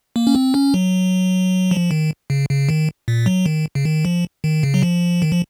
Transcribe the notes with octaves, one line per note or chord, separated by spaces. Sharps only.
A#3
C#4
C4
C#4
F#3
F3
D#3
C#3
C#3
D#3
A#2
F#3
D#3
C#3
D#3
F3
D#3
C#3
F#3
F3
D#3
F3